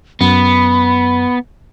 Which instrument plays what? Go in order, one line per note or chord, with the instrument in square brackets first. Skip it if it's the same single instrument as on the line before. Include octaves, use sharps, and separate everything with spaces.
[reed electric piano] F#2 [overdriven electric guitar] B3 [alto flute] B5